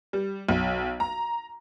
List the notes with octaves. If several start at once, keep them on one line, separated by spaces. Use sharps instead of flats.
G3
B1
A#5